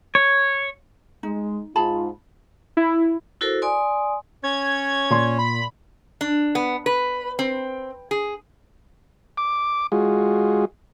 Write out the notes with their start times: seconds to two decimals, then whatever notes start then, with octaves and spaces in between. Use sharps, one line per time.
0.15 C#5
1.23 G#3 D#4
1.76 G#2 F4 G#4 A5 B5
2.77 E4
3.41 E4 F#4 A4 A#4 C5
3.62 D5 G#5 C6 D#6
4.44 C#4 C#5 G#6
5.10 A#2 C6
5.39 B5
6.21 D4
6.55 B3
6.86 B4
7.39 C4
8.11 G#4
9.37 D6
9.92 G#3 F4 F#4 G#4